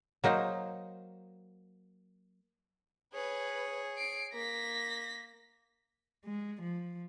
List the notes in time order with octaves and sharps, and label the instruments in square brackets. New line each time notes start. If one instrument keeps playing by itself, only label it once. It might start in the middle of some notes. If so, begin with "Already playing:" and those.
[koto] F#3 A#3 D#4 C5
[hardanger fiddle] G#4 C#5 [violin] B4
[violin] C7 D7
[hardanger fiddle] A#3 [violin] A#6 B6
[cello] G#3
F3